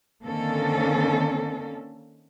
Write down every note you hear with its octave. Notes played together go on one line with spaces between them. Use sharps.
D3 D#3 A#3 C4 C#4 A4